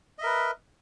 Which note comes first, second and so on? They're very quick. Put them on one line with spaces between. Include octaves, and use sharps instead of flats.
D#5 E5 A#4 B4